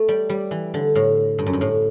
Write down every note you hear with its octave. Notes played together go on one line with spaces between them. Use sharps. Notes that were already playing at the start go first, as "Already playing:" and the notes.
Already playing: A3
G3
G3
E3
D3
A2
G2
F#2
G2
A2